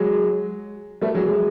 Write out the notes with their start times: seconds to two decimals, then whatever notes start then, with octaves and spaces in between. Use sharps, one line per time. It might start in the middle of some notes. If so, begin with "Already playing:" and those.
Already playing: F#3 G#3
1.02 G3 A3
1.14 F#3 G#3
1.26 F#3 G#3